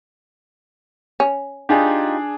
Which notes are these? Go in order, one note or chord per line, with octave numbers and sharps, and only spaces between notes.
C#4
D4 D#4 F4 G4 G#4